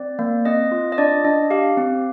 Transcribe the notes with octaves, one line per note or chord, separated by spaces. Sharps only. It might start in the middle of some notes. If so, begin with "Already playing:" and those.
Already playing: C4 D5
A#3
C4 D#5
F4
D#5
D4 D5
D4 D#5
G4 F5
C4